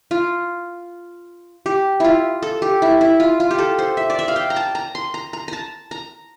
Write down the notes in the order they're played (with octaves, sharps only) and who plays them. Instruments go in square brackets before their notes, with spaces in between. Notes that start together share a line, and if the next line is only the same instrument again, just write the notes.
[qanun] F4
G4
E4 F4
A4
G4
E4
E4
F4
F4
G4
A4
C5
E5
D5
E5
F5
G5
A#5
A5
A#5
C6
A#5
A#5
A5 A#5
A#5